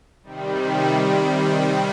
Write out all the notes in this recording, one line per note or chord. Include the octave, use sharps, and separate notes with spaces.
C3 D#3 G3